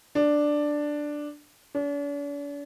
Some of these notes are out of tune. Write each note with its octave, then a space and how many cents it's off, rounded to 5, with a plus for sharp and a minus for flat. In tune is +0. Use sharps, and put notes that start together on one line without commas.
D4 +5
D4 -45